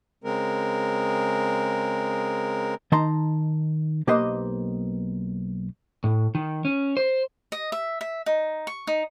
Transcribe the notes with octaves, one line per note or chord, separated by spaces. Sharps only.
C#3 G#3 C4 A#4
D#3 D#4 A5 A#5 C6
B1 A#3 G4 B4 C5 D#5
A2
D#3
C#4
C5
D#5
E5
E5
D#4
C#6
D#4